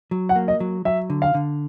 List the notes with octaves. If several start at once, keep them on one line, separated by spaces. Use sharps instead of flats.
F#3
F#5
A#3
D#5
F#3
F#3 E5
D3
F5
D3